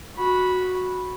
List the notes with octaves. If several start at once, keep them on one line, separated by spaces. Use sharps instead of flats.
F#4 B5